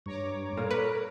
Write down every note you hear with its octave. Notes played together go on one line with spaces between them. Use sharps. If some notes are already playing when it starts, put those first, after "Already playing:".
G2 C#5 A#5 D6
A#2 A4 A#4
A#4 B4